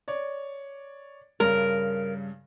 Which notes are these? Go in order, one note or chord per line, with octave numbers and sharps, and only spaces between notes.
C#5 D5
G2 C#3 A#4